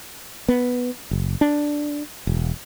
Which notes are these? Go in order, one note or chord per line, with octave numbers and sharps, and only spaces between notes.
B3
F#1
D4
E1